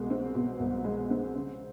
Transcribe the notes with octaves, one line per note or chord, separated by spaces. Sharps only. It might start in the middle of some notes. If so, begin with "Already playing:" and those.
Already playing: C2 B2 G#3
C4
B2
C2
G#3
C4
C#3